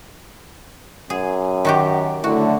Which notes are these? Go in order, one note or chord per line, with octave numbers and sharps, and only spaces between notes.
F#2 G#4
D#3 F#4 G4
D3 F#3 A3 E4 F#4